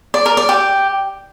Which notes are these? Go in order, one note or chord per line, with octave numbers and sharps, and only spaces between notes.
D5
A#4
D5
G4